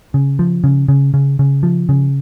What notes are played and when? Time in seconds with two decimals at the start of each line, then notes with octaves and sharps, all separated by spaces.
0.14 C#3
0.39 F3
0.64 C#3
0.88 C#3
1.14 C#3
1.39 C#3
1.63 F3
1.89 C#3